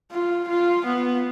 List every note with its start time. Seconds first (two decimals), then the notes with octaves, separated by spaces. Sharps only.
0.11 F4
0.48 F4
0.85 B3